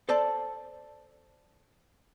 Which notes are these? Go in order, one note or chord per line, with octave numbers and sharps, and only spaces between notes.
A4 C5 D5 A5